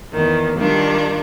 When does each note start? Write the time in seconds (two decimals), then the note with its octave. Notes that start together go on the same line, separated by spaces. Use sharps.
0.14 E2 D#3
0.58 D#3 G3 D4 F4